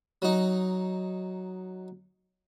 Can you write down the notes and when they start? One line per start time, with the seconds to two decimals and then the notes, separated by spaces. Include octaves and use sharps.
0.22 F#3 D#4